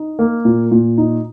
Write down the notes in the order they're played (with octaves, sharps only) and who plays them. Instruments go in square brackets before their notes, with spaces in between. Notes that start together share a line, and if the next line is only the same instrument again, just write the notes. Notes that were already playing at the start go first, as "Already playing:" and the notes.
Already playing: [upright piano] D#4
A#3
A#2
A#2
D#4